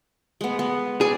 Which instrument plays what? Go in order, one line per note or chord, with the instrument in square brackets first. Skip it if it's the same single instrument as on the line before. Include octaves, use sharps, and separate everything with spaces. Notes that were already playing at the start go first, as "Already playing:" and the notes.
[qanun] G#3 B3
B3
[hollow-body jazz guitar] G#4 [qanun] D5